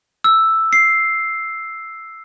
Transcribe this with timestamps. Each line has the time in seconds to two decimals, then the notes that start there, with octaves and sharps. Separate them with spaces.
0.24 E6
0.73 C7